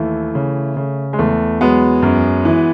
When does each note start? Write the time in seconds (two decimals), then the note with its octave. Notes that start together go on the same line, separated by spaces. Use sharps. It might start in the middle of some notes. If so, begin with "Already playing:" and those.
Already playing: D#2 E3 A3
0.35 C#3
0.77 C#3
1.13 G#3
1.19 E2 A3
1.61 F#3 G#3 B3
2.02 F#2
2.45 E3